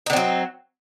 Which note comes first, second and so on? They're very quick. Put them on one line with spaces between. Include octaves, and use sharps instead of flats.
D#4 D3 C4 F#3